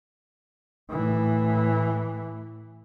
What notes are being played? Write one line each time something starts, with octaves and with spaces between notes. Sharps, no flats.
A2 E3